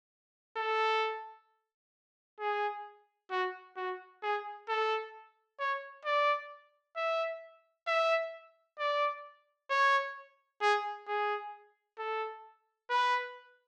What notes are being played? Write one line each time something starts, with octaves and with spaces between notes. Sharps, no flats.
A4
G#4
F#4
F#4
G#4
A4
C#5
D5
E5
E5
D5
C#5
G#4
G#4
A4
B4